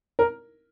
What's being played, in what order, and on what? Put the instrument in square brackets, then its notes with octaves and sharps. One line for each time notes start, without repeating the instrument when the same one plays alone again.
[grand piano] A#4